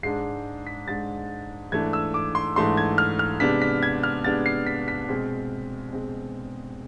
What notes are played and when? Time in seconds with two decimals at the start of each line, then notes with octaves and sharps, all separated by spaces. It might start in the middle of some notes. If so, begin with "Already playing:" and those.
0.03 G#2 G#3 D4 C7
0.67 B6
0.88 G#2 G#3 D4 A6
1.72 G#2 E3 A3 D4 G#6
1.93 E6
2.14 D6
2.35 C6
2.56 G#2 E3 A3 D4 C6
2.77 G#6
2.98 F6
3.19 F6
3.40 C3 G#3 B3 D4 B6
3.62 B6
3.83 G#6
4.03 F6
4.24 C3 G#3 B3 D4 A6
4.46 C7
4.67 B6
4.88 B6
5.09 B2 G#3 C4
5.93 B2 G#3 C4